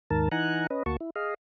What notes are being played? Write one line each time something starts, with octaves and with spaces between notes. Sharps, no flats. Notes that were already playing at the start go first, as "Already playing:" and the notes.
D#2 G#2 D#3 A#4 A5
E3 D#4 F#5 G#5 A#5 F#6
C#4 B4 D#5
D2 A#3 F#4 A5 C#6
E4
G#4 D#5 F5